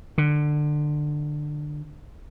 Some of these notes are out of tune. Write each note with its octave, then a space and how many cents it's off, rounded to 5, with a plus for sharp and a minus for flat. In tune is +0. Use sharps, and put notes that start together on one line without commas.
D3 +20